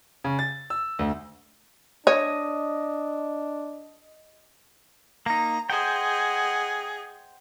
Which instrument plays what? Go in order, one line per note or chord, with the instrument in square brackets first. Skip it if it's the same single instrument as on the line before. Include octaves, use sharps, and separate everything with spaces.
[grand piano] C#3
A6
E6
D2
[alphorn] D4 [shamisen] C#5 [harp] D#5
[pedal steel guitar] A#3 D#4 [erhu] A#5
[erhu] G#4 [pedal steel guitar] C5 G5 [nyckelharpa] D#5 F#5